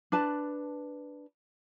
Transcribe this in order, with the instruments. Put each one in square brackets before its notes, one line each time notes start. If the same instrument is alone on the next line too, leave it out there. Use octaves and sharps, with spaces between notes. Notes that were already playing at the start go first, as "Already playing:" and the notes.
[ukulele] D4 B4 A5